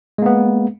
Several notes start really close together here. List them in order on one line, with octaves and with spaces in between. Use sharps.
G#3 A#3 B3